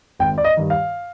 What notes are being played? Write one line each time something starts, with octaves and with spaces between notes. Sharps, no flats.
G#1 G5
D5
D#5
G2 D#3
F5